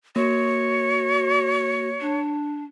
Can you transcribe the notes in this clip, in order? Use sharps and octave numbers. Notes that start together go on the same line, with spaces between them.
A#3 F#4 C#5
D4